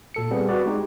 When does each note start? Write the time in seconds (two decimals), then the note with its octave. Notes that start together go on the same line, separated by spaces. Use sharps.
0.14 A#2 A4 C#7
0.31 G3 B3 C4 G#4
0.49 F#4 B4 D5
0.66 G#3 D#4 G4